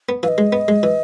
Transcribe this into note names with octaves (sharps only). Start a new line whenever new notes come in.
B3
E3 F5
D#5
G#3
B3
G#3
E3